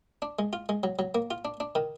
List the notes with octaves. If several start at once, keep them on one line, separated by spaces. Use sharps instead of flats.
D4
G#3
F4
G#3
F#3
F#3
A#3
F4
D4
D4
D#3